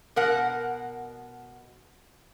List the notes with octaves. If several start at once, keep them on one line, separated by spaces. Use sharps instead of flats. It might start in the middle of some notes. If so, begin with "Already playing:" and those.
B2 A#4 F#5